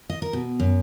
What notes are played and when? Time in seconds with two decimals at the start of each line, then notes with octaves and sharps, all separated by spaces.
0.10 D#5
0.22 A#4
0.33 B2
0.60 F#2